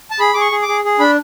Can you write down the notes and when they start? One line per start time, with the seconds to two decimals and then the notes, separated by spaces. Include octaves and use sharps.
0.11 A5
0.20 G#4 B5
0.34 G#4 D6
0.41 C#6
0.52 G#4
0.62 D6
0.68 G#4
0.84 G#4
0.99 D4 B5